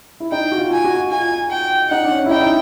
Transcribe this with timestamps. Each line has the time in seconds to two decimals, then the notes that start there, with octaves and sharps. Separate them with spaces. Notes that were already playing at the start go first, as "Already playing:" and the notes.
0.20 E4
0.32 D#4 G5
0.52 F#4
0.58 F4
0.72 G#5
0.84 F#4
1.11 F4 G#5
1.51 G5
1.91 D#4 F#5
2.05 D4
2.11 C#4
2.26 E4
2.30 D#4 G5
2.41 D#4